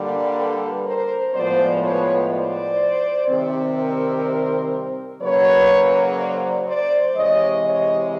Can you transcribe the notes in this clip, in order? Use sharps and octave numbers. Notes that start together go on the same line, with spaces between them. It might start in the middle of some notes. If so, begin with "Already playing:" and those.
Already playing: D3 G3 A#3
A4 B4
A#4 C5
A2 F3 G#3 B3 C5 D5
B4 C#5
C5 D5
C3 D#3 G3 C4
A#4 C5
C#3 F#3 A#3 B4 C#5
C5 D5
C5 D5
C3 E3 G#3 C#5 D#5
C#5 D#5